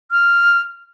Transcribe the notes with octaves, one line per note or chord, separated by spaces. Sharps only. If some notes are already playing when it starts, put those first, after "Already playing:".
F6